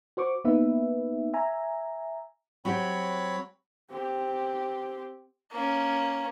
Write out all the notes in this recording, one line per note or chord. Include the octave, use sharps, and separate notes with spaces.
F#4 C5 C#6 D6
A#3 B3 D#4 B4 E5
E5 G#5 A#5
F#3 C4 F#4 G4 C#5 B5
C4 G4
A#3 C#4